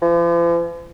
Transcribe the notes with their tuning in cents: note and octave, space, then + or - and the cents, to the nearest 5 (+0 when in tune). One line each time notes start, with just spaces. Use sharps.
F3 -45